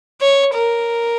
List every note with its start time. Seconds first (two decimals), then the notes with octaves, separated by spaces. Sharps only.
0.21 C#5
0.54 A#4